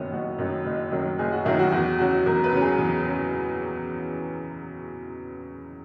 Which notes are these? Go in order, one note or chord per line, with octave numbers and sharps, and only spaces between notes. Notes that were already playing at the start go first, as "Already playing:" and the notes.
Already playing: F#1 F#2 D#3 F#3 B3 C#4
F#1 F#4
F#2 D#3 F#3
F#1
F#2 D#3 F#3
F#1 G#4
F#4
F#2 D#3 F#3 E4
F#4
E2 F#4
C#3 F#3 F#4
E2 A#4
B4
C#3 F#3
G#4
E2
C#3 F#3